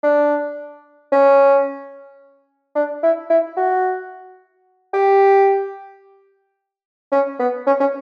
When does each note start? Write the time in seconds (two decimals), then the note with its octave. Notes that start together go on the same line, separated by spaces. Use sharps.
0.03 D4
1.12 C#4
2.75 D4
3.03 E4
3.30 E4
3.57 F#4
4.93 G4
7.12 C#4
7.39 B3
7.67 C#4
7.80 C#4